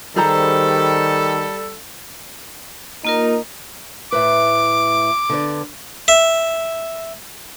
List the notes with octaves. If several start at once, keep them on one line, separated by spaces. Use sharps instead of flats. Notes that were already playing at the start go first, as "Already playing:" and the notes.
D#3 G3 G#4 A4 C5 A#5
A#3 D#4 F4 A#4
A2 B4 D6
D3 B3 D5
E5